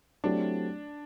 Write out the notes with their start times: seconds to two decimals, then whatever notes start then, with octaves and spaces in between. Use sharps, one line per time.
0.24 F#3 A3 C4 D4 E4 G4